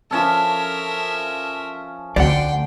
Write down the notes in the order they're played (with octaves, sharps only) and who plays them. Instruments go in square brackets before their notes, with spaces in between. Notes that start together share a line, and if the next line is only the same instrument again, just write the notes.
[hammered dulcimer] F3 C#4 A4 [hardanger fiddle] A#4 E5
[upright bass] D2 [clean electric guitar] D5 F#5 [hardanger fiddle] G5 C6